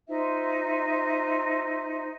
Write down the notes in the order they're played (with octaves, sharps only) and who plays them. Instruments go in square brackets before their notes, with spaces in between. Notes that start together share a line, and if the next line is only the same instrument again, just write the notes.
[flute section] D#4 F4 C5 E5